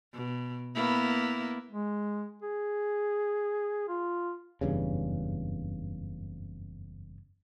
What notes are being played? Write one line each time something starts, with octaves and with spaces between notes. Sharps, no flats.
B2
A#3 B3 E4
G#3
G#4
F4
F#1 E2 G2 C#3